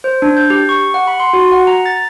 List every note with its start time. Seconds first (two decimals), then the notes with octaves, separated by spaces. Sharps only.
0.04 C5
0.22 D4
0.37 G6
0.50 G4
0.69 C#6
0.94 F#5
1.07 B5
1.20 C6
1.33 F#4
1.52 F#5
1.67 A#5
1.86 A6